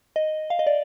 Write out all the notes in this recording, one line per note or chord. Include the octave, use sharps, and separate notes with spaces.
D#5
F5
D#5
D5